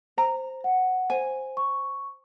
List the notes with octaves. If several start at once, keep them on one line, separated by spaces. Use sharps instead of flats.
C5 A#5
F#5
C5 G#5
C#6